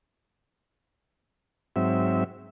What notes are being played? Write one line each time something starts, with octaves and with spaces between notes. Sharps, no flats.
G#2 F#3 C4 E5